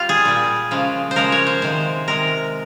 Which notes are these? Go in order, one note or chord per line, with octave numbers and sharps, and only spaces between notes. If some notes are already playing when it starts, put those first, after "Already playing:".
Already playing: G3 F4
G#4
A#2 G3
C#3 F3 G#3
C5
C#3 F3 G#3 A#4
C#5
C5
C3 D#3 G#3 C5
C3 D#3 G#3 A#4